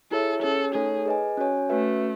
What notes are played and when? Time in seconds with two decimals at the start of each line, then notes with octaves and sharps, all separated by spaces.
0.11 E4 G#4 A4 C#5 E5
0.42 C#4 G#4 A4 C#5
0.75 A3 D#4 G#4 A4 C#5
1.06 G#4 B4 D#5 G#5
1.37 C#4 F#4 C#5 G#5
1.70 A3 C#4 F#4 B4 E5